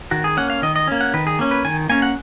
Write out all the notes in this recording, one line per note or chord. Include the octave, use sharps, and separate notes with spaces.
D#3 F#4
G#4
A#3 C#4 F#5
F5
D#3 D#5
D#5
A#3 C#4
F#5
D#3 B4
G#4
A#3 C#4
B4
D#3 G#5
A#3 C#4 G#5
F#5